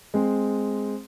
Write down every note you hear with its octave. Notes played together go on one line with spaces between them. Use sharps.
G#3 C4